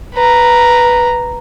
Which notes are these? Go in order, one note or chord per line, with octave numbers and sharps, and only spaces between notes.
B4 A#5